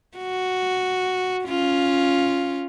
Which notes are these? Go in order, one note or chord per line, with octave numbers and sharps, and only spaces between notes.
F#4
C#4 F4